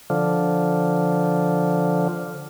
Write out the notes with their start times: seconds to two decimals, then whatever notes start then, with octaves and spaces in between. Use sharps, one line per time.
0.10 D3 F3